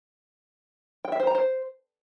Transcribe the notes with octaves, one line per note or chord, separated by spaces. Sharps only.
G5
E5
C5
A#5
C5